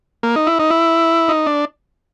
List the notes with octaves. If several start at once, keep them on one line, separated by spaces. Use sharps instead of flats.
A#3
D#4
E4
D#4
E4
D#4
D4